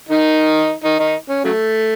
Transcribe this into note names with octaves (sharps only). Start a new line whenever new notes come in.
D#3 D#4
D#3 D#4
D#3 D#4
C#4
C#3 F#3 A3